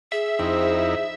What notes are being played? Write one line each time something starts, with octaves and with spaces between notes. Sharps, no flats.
G#4 E5
F2 C4 D#4 E4